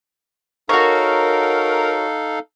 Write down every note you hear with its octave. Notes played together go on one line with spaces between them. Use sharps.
D#4 F#4 A4 A#4 C#5 F5